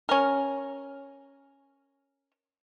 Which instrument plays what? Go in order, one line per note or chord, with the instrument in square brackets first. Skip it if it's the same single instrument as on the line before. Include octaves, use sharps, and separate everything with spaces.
[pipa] C#4 A#4